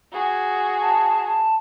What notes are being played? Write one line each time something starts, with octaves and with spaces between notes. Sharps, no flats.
F#4 G#4
A5
A5